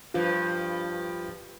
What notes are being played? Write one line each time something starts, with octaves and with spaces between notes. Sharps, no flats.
G2 F3 F4